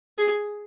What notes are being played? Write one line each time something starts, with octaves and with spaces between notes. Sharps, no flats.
G#4